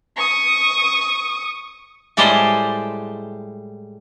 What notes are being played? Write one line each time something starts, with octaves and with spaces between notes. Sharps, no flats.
C#6 D#6
A2 G3 G#3 G4 C5 A5